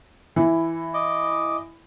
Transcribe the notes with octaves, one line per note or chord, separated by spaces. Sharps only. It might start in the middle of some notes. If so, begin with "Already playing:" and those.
E3 E4
D#5 D6